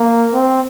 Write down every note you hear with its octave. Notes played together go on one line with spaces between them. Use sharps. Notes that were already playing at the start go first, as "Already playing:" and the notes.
Already playing: A#3
C4